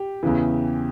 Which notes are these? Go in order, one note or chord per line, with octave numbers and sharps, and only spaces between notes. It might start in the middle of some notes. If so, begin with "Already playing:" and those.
Already playing: G4
E2 C#3 E3